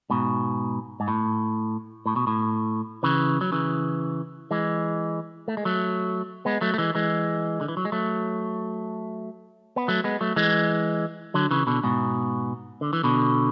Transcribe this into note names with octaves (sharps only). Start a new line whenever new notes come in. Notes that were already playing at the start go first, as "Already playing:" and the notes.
G#2 B2
G#2
A2
A2
B2
A2
C#3 E3
F#3
C#3 E3
E3 G#3
A3
G#3
F#3 A3
G#3 B3
F#3 A3
A3
E3 G#3
E3 G#3
D3
E3
F#3
G#3
F#3 A3
B3
F#3 A3
G#3 B3
F#3 A3
E3 G#3
D3 F#3
C#3 E3
B2 D3
G#2 B2
D3
E3
B2 D3